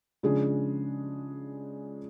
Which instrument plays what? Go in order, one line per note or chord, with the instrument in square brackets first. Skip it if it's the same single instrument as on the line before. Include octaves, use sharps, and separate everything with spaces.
[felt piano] C#3 F3 G#3 D4 G#4